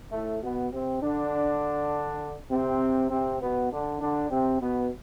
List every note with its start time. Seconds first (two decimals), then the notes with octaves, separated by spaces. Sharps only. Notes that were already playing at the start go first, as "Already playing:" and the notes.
0.11 A2 A3
0.41 B2 B3
0.71 C3 C4
1.01 D3 D4
2.50 C3 C4
3.10 C3 C4
3.40 B2 B3
3.70 D3 D4
4.00 D3 D4
4.30 C3 C4
4.60 B2 B3